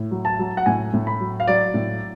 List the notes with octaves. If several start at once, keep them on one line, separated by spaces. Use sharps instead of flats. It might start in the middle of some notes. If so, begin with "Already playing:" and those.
Already playing: A2
F#3
A5
F#3
F#5
A2 G#5
A2
B5
F#3
F5
F#3 D5
A2